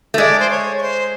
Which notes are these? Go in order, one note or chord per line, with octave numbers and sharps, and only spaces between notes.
A3
G#3 D5
C5
C#5
C#5
C5